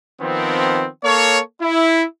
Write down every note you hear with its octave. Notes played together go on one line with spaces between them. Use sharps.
D#3 F3 B3 C4
A#3 A4 C#5
E4